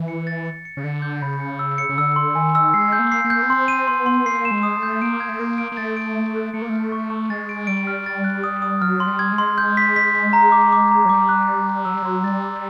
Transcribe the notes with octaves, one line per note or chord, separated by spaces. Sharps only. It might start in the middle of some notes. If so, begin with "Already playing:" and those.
Already playing: E3
C#7
A6
C#7
C#7
C#3
D3 C#7
G6
C#3 B5
C#7
E6
C#7
C#3
D3 E6
C6
D#3 G#5
E6
G#3 C7
G6
A#3
C7
A#3
G6
B3
C4 C6
D#7
B3 C6
C6
A#3 C7
E7
G#3
D#6
A3
G6
A#3 D7
G#6
A3
A#3 D7
D7
A#3
A3 A6
D7
A6
F#6
A3 C#7
A#3
A3 F6
C#6
C#6
G#3 A6
D7
G3 D7
F6
A6
F#6
D#6
D#6
F#3 F6
C6
G3
G#6
G#3
C6
G6
B6
B6
B6
A#5
D6
D6
A#5
F#3
G3 D6
F#6
F#6
D6
F#3 E6
G3
F#3 C6
G3 A6
E6